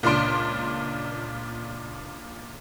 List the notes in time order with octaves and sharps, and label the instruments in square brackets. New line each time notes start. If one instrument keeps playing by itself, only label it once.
[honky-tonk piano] C#2 A#2 D4 C6 D7